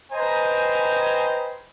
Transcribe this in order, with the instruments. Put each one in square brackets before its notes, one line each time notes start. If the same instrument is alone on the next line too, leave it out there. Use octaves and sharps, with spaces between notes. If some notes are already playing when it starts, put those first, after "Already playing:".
[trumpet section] B4 C5 D#5 G5 G#5 A#5